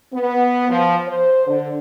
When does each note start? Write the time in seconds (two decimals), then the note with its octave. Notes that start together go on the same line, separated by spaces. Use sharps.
0.14 B3
0.69 F3
1.07 C5
1.47 D3